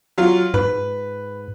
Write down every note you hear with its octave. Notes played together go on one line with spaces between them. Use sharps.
F#3 F4
G#2 B4